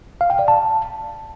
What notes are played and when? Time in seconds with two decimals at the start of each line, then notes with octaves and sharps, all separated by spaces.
0.21 F5
0.30 G5
0.39 D5
0.48 A5